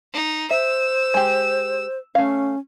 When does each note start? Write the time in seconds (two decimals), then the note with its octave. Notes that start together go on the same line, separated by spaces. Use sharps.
0.13 D#4
0.51 C5 E5 E6
1.14 G#3 G4
2.15 A3 C#4 F5